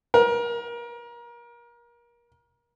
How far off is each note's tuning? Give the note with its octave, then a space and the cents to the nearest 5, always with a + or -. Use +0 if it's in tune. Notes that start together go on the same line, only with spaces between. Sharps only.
A#4 +30